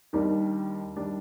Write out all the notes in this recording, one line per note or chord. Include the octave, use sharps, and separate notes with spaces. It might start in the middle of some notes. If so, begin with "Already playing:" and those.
D#2 D#3 G3 D4
D#3 G3 D4